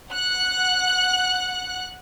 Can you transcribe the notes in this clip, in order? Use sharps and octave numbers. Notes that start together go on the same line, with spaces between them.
F#5 F#6